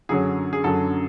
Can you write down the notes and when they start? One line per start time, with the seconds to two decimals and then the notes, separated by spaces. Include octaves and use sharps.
0.09 F#2 D3 F#3 C#4 G#4
0.53 G#4
0.64 F#2 D3 F#3 C#4 A4